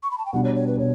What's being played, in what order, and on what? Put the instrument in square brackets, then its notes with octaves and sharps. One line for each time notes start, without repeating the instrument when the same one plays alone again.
[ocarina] C#6
B5
A5
G5
[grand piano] B2 G3 D4 [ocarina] F#5
[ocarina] C#5
C#5
B4
[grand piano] B2 [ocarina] C#5